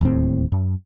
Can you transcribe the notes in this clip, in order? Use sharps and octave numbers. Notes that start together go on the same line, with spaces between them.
D1 D#2 A2 C4
F#2